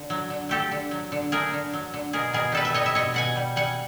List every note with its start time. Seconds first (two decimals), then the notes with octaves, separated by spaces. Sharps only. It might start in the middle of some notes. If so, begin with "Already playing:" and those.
Already playing: D3
0.10 F#3
0.30 D3
0.49 A3 G4 A4
0.72 D3
0.91 F#3
1.12 D3
1.32 A3 G#4 A#4
1.53 D3
1.73 F#3
1.94 D3
2.13 B2 G#4 A#4
2.34 B2 G#4 A#4
2.52 G3 A4 B4
2.65 E5
2.74 G3 C#5 D#5
2.86 E5
2.95 B2 C#5 D#5
3.14 B2 F#5 G#5
3.36 G3
3.56 G3 F#5 G#5